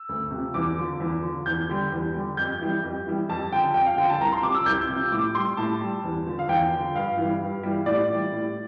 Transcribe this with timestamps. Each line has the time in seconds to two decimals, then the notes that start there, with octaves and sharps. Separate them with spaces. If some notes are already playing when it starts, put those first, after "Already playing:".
Already playing: E6
0.09 D2
0.31 C3 F3
0.54 E2 D6
0.77 D3 F3
1.00 E2
1.23 D3 F3
1.46 E2 G6
1.69 D3 G3
1.92 E2
2.14 D3 G3
2.37 F2 G6
2.61 E3 G3
2.84 F2
3.07 E3 G3
3.29 F2 A5
3.52 D3 F3 G5
3.74 F2 G5
3.86 F5
3.98 D3 F3 G5
4.09 A5
4.20 C2 A#5
4.32 C6
4.43 C3 F3 D6
4.54 E6
4.66 C2 G6
4.89 C3 F3
5.12 A2 D6
5.35 G3 C6
5.57 A2 A5
5.81 G3
6.04 E2
6.26 D3 F3
6.39 F5
6.49 E2 G5
6.73 D3 F3
6.95 G2 F5
7.17 E3 G3
7.42 G2
7.63 E3 G3
7.86 A2 D5
8.10 E3 G3
8.32 A2